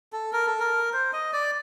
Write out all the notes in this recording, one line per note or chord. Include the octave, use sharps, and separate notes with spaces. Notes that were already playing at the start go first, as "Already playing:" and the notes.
A4
A#4
A4
A#4
C5
D#5
D5